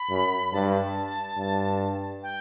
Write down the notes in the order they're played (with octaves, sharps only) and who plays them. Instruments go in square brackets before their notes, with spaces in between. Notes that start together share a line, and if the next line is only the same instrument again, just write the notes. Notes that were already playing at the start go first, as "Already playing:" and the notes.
Already playing: [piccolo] B5
[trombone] F#2
[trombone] G2 [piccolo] A5
[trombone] G2
[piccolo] G5